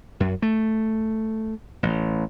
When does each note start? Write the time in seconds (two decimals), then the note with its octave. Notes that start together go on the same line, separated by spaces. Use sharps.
0.20 F#2
0.42 A3
1.83 A1